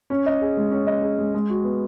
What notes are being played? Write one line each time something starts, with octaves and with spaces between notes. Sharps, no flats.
C#4
D#5
G#4
G#3
C#4
D#5
G#4
G#3
G#3
F#4
B3